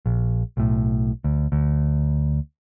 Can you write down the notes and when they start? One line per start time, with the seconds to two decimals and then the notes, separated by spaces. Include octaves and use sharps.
0.06 A#1
0.57 B1 A2
1.24 D2
1.52 D2